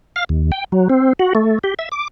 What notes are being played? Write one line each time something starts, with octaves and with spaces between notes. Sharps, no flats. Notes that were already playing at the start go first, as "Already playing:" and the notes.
F5
D#2
G5
F#3
C4
F#4
A3
G4
E5
D6